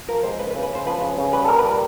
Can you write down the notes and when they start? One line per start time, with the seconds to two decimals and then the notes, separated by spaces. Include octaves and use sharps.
0.08 F3 A#4
0.23 G#3 C5
0.39 C#3 B4
0.51 B4
0.56 C#3
0.63 B4
0.71 C#3 C5
0.86 F3 B4
1.01 C#3
1.18 C#3
1.32 G3 B4
1.45 A4
1.48 A#2 A#4
1.59 B4
1.64 G3 A#4